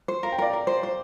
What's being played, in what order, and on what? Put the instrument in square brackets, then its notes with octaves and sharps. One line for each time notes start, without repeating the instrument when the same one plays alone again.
[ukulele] C5
[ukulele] A#4 [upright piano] F5
[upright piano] G5
[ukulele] A#4 [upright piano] D5 F5
[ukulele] A#4
C5
C5